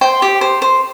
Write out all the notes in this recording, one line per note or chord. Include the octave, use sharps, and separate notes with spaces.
C5 G5 C6
G4
C5
C5